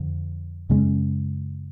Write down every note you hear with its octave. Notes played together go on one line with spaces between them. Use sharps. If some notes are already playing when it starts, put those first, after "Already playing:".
Already playing: F2 D3
F#2 C#3 G#3 C#4